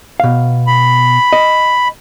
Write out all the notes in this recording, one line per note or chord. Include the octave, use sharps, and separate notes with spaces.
B2 F5
B5
D#5